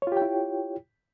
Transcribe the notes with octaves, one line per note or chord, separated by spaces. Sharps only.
E4 F4 G4 C#5 G5